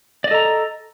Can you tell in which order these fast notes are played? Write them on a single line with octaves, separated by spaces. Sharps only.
D5 D#5 A4 A#5